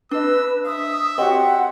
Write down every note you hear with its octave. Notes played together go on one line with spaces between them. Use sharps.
D4 B4 D#5 E6
C5 E5 D#6
C4 F#4 G4 C#5 D#5 F#5